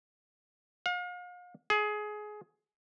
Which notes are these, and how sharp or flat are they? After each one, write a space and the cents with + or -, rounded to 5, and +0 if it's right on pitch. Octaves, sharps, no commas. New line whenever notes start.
F5 +40
G#4 +20